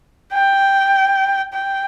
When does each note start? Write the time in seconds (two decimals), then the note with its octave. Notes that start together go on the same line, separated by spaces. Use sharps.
0.33 G5
1.53 G5